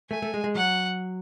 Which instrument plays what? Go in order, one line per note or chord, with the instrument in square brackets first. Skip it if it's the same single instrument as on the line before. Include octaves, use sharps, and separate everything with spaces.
[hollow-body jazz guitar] A3 [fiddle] G#5
[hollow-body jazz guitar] A3
G#3
G#3
[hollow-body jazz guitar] F#3 [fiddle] F#5